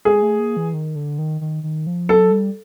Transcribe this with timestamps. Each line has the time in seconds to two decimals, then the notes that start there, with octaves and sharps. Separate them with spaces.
0.05 G#3 G#4
0.22 A3
0.39 A#3
0.57 E3
0.73 D#3
0.95 D3
1.18 D#3
1.41 D#3
1.63 D#3
1.87 F3
2.08 F#3 A4
2.31 G3